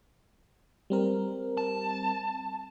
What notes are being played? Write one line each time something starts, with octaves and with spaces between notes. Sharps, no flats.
G3 C4 A#4
A5